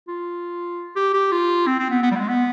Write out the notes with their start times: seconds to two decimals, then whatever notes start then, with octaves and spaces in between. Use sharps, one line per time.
0.08 F4
0.96 G4
1.14 G4
1.32 F4
1.67 C4
1.79 C4
1.90 B3
2.02 B3
2.11 G3
2.15 B3
2.20 G#3
2.28 B3